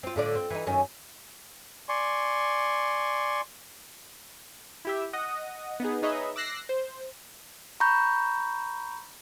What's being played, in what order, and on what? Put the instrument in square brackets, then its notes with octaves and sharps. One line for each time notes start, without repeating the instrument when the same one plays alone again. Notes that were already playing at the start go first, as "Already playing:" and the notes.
[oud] C4 F4
A2 D3 D5
C4
E3 D#4
F#2 D#3 C#4
[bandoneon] D5 G#5 C6 C#6
[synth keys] E4 G4 E5
D#5 F#5 D#6
B3 D#4 G#4
D#4 G#4 B4 C#5 D#5 E5
D6 E6 F#6 A#6 C7
C5
[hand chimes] A#5 B5 C#6 G6